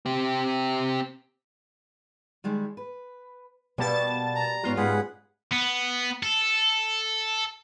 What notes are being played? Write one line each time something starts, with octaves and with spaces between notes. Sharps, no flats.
C4 G4
D#3 G3 G#3
B4
B2 G3 A#3 B4 A5 A6
A#5
G#2 B3 F4 C#5
G#2 C#3 G#3 G#4 B4 F#5
B3
A4